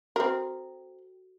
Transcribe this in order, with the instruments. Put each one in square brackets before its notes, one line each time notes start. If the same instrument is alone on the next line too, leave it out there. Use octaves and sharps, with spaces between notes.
[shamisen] C4 A#4 [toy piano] F#4 A4